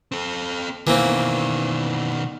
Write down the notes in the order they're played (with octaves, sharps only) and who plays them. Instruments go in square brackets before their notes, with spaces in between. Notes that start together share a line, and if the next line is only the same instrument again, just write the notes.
[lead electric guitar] C4 A4
[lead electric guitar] B2 D#3 [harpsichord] E3 A#3 C4